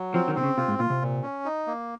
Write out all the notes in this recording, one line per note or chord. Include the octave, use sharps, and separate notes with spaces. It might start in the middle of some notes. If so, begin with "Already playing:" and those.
Already playing: F#3
F3 C4
D#3
C3 C4
C#3
C3 F4
G#2
A#2 F4
C3
A#2
C#4
D#4
A#3